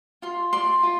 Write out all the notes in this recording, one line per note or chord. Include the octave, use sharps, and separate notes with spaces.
F4 C6
D5 C6
F4